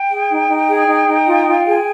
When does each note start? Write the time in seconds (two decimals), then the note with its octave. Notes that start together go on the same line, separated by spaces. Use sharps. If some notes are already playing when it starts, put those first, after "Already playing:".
Already playing: G5
0.09 G#4
0.29 D#4
0.48 D#4
0.68 G#4
0.88 D#4
1.08 D#4
1.27 F4
1.47 F4
1.67 G#4